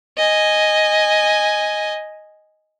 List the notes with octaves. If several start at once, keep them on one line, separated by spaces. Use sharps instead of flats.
D#5 G#5